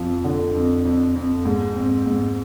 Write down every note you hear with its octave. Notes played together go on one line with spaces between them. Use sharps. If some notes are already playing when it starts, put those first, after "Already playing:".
Already playing: F2 F3
D3
F2
F2
F2
G#2
C4
G#2